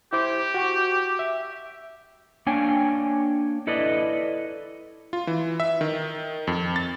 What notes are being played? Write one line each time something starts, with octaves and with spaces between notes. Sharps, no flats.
E4 G4 C5 D6
F#4 G5 C#6
E5
A#3 D4 C#5 G5 G#5
E4 A4 B4 D5 D#5
F4
E3
E5
D#3
F2
A6